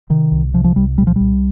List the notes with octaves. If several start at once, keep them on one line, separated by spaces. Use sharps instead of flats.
C3 D#3
C2
C3 F3
F3
C2 G3
A#2 G3
F3
C2 G3